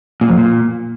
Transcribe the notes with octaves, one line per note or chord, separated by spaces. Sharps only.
A#2
F2
A#2